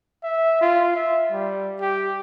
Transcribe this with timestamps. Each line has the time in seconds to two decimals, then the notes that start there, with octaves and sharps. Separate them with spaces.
0.23 E5
0.61 F4
0.96 E5
1.32 G3
1.81 G4